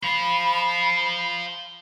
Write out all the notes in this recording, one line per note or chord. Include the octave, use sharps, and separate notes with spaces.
C5 F5 B5